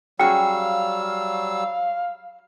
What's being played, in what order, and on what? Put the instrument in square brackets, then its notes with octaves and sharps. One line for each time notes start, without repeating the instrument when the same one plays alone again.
[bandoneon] F#3 G3 E6 [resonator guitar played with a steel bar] C#4 F#4 G#4 [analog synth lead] F5 [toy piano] G5